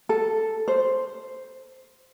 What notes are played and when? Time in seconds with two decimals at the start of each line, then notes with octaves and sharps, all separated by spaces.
0.09 A4
0.68 C5